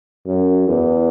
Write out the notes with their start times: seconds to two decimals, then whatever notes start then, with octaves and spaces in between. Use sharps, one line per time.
0.27 F#2
0.68 E2